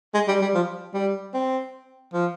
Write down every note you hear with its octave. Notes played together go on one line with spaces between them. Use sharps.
G#3
G3
G3
F3
G3
C4
F3